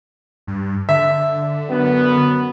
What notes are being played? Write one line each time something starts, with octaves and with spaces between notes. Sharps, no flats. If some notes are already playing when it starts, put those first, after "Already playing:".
G2
D3 E5
F#2 B3